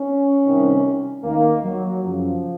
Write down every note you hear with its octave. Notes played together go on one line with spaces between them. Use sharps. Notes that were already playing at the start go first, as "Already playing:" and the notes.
Already playing: C#4
C2 C3 D#3
D#2 D#3 A#3
F#3
F#2 C#3 F3